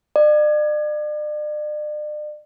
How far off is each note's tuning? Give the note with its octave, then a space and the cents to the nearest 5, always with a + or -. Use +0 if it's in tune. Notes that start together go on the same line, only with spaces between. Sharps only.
D5 +40